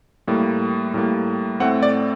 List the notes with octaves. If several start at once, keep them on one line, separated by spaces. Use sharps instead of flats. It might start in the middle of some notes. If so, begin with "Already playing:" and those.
A2 G3 A#3
A2 G3 A#3
A2 A3 C4 F#5
D5